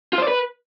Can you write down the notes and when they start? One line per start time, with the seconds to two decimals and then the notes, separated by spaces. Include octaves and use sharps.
0.13 F4
0.18 C5
0.23 D5
0.28 B4